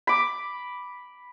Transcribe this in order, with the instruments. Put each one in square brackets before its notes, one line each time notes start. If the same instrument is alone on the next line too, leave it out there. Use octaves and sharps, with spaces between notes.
[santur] B5 D6